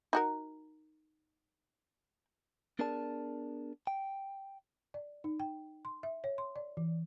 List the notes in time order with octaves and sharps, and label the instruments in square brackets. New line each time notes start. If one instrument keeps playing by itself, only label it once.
[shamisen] D#4 F#4 A#4
[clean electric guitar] B3 D4 G#4 A#4 D5 A5
G5
[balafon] D5
D#4
G5
C6
E5
C#5
C6
D5
E3